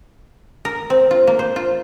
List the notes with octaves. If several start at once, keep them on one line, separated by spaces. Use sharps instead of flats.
A#4
C4
F4
A#3
C5
F4